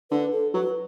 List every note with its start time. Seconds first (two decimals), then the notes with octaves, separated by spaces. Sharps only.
0.11 D3 B4
0.32 A4
0.54 F#3 B4